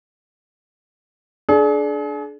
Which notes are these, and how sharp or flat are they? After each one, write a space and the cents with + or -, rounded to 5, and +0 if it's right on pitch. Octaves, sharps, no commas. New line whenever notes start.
D4 +0 G#4 +40